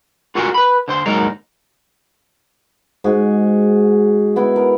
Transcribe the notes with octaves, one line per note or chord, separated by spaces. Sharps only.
F4 F#4 A4 A#4 F#5 G#5
B4 B5
D3 C5 C6
D#2 G#2 F#3 D#4 A#4 A#5
G#2 F#4 G#4
B3 E4
A#4